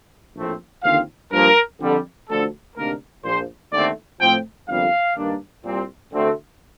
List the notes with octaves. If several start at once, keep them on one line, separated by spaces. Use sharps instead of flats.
A#1 A2 A3 C4
D#2 D3 F3 C4 F5
G2 F3 A#3 A#4
F2 D3 G3
D2 D3 F3 A4
D2 C3 D#3 A#3 D4 A#4
A#1 A#2 F3 C5
D#2 D3 A3 C4 D5
A2 F3 C4 G5
G1 F2 C3 G3 A#3 F5
G2 D#3 A#3 D4
C2 A#2 G3 C4
D2 D3 A3 C4